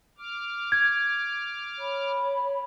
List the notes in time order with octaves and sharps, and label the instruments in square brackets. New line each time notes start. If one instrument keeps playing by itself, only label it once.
[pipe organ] D6 F6
[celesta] G#6
[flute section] C#5 B5